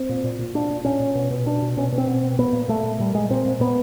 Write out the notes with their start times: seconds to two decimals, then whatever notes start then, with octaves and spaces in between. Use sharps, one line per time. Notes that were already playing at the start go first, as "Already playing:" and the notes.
Already playing: C4
0.09 A#2
0.24 A#2
0.39 A#2
0.54 A#2 D4
0.70 A#2
0.85 A#2 C#4
1.00 A#2
1.15 B2
1.30 B2
1.46 B2 D4
1.62 B2
1.77 B2 C#4
1.92 B2
1.98 C4
2.07 B2
2.23 B2
2.38 A#2 B3
2.53 A#2
2.68 A#2 A3
2.83 A#2
2.99 A#2 G3
3.14 A#2 G#3
3.30 A#2 C4
3.46 A#2
3.60 A#2 B3